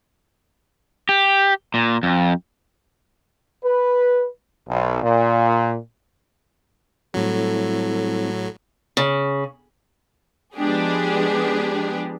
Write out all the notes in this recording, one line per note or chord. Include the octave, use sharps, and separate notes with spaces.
G4
A#2
F2
B4
B1
A#2
A2 F#3 G3 C4 E4 A4
C#3
F3 G#3 B3 D4 G4 G#4